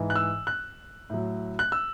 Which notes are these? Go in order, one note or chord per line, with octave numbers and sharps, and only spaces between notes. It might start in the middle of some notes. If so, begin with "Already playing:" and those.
Already playing: G#2 E3
F#6
E6
F#6
A2 F#3
F#6
E6